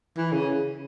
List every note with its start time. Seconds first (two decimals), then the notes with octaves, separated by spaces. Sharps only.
0.17 E3
0.32 C#3